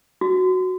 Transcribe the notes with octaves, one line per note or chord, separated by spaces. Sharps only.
F#4